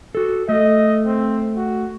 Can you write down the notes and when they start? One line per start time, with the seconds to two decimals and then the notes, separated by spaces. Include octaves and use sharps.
0.15 F#4 A4
0.49 A3 D#5
1.06 C4
1.57 F#4